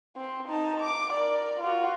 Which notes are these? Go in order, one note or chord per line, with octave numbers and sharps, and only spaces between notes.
C4
D#4 A5
D6
A#4 D5
F4 F#4